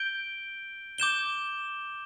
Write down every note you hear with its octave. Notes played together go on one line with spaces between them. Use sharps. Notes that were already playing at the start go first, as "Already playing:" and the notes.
Already playing: G6 D7 G7
D6 G6 E7 G7